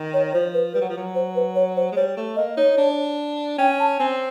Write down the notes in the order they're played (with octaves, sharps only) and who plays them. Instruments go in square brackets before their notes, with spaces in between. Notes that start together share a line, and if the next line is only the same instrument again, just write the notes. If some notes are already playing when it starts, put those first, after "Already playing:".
Already playing: [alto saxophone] D#3
[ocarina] C#5
[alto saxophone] F3 [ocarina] C5
[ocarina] B4
[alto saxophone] G3 [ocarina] B4
[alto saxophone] F#3
F3
F#3
[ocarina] C5
B4
C#5
C5
[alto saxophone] G#3
[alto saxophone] G3 [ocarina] C#5
[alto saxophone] A3
[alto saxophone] A#3 [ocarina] D#5
[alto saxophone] D#4 [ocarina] C#5
[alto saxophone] D4
[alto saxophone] C#4 [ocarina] G5
[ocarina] A5
[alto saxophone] C4 [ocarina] G#5